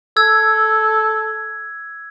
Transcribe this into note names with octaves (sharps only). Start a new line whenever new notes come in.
A4 E6 G#6